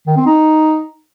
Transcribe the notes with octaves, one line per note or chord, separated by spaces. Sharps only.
D#3
C4
D#4